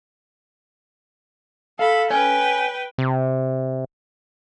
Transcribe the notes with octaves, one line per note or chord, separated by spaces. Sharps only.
A4 F5 B5
B4 C#5 G5 G#5
C3